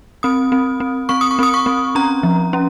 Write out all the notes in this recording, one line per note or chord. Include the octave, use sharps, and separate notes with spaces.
C4 D#6
C4
C4
C4 C#6
D#6
C#6
C4 D#6
C#6
C4
C#4 A#5
F3
C#4